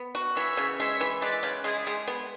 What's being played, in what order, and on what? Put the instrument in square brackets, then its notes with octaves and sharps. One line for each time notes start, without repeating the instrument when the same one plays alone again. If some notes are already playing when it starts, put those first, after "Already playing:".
Already playing: [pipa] B3
F#4
[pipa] E3 [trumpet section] C#5 E5
[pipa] C#3
[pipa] G#3 [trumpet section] C#5 E5
[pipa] E3
[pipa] G#3 [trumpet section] B4 D5
[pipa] C#3
[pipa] G#3 [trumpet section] E4 G#4
[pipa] G#3
B3